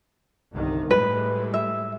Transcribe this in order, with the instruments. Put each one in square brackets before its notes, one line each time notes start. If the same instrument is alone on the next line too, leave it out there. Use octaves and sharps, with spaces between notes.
[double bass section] G1 C2 D#3
[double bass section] A2 G3 G#3 [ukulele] B4
[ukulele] E5